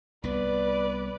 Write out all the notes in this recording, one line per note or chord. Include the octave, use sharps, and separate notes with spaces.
C2 B3 B4 D5